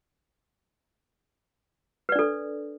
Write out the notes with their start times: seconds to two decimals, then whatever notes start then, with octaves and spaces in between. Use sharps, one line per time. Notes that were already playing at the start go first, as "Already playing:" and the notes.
2.09 B4
2.12 D5
2.15 D4
2.19 A4